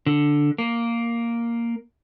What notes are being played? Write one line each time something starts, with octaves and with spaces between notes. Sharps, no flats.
D3
A#3